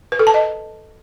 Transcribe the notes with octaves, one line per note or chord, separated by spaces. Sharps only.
B4
A4
A5
D#5